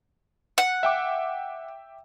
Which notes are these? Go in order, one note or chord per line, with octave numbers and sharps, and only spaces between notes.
F#5
E5 G5 D6